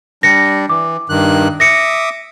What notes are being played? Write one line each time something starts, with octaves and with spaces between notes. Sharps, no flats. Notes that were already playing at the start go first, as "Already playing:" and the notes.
G3 D4 A#6 C#7
E3 D6
G2 D#3 F#6
E5 D6 D#6 A#6 C#7